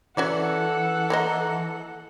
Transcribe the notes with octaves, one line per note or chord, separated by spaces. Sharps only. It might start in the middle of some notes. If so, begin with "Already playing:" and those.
E3 C#4 F#4 A4 D5 F#5
A#3 A#4 D#5